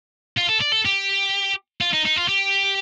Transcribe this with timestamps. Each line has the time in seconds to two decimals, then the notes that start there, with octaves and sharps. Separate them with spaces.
0.38 F4
0.49 A4
0.61 D5
0.72 A4
0.85 G4
1.81 F4
1.93 D#4
2.05 D#4
2.16 F4
2.28 G4